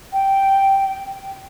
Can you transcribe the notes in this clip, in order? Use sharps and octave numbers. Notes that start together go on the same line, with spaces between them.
G5